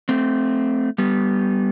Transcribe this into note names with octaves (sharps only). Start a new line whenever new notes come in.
A3 C4
G3 B3